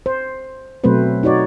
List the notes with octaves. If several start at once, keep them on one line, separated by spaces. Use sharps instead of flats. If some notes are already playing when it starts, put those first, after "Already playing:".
C5
B2 F#3 A3 C4 B4 C5
D#4 F#4 C#5 D5